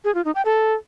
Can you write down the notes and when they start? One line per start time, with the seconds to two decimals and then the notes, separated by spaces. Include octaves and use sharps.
0.05 G#4
0.15 F4
0.25 D#4
0.35 G5
0.45 A4